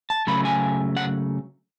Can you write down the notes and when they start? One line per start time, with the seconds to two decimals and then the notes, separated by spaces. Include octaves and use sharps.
0.10 A5
0.27 C#3 F#3 A3 B5
0.45 G#5
0.97 F#5